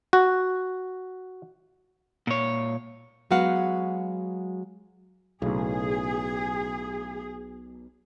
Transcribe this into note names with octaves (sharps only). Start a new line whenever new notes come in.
F#4
A#2 C#5
F#3 G#3 B3 F#4 F5 F#5
B1 A2 C#3 G#4